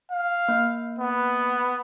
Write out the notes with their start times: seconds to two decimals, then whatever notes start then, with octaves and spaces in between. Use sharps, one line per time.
0.12 F5
0.48 A#3
0.99 B3